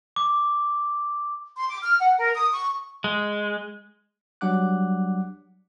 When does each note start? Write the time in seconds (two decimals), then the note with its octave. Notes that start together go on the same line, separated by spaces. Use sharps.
0.16 D6
1.57 C6
1.69 D6
1.83 F6
2.00 F#5
2.18 A#4
2.35 D#6
2.51 C#6
3.04 G#3
4.41 F#3 G3 D4 F#5 D6 F#6